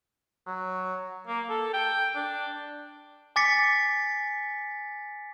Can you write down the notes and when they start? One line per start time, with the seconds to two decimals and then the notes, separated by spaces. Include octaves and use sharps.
0.47 F#3
1.27 A#3
1.50 A4
1.73 G5
2.15 D4
3.36 G#5 D6 A6 B6 C#7